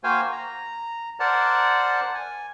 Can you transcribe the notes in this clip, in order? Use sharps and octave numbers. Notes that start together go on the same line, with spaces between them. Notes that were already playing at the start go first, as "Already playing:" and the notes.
A#3 F#4 C5 F5 G5 G#5
A#5
A#4 C5 D5 F#5 A5
G#5